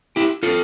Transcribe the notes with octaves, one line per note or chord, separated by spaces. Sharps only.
E4 G4
F4 A4